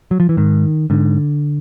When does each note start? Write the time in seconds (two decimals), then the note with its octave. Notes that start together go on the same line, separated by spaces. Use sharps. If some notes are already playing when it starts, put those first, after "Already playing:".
0.11 F#3
0.20 F3
0.29 E3
0.37 G#2 D#3
0.90 G#2 D3